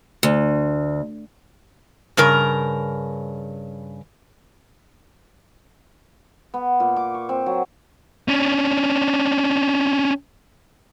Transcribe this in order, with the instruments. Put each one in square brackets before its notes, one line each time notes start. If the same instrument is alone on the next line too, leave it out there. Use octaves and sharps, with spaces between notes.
[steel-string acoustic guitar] D2
[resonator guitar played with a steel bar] G2 C#3 A#4
[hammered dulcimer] B3
A#2
D6
C#6
C4
F#3
[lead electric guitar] C#4 D4